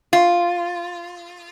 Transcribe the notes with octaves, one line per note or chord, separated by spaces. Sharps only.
F4